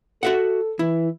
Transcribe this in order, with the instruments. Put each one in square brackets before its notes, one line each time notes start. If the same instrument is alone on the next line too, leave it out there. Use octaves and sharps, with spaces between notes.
[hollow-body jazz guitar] F#4 E5 F#5 [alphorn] A4
[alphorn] E3 [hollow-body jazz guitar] E4